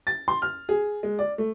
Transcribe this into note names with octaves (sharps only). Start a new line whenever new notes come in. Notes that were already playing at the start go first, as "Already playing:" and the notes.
A6
C6
F6
G#4
G#3
D5
A3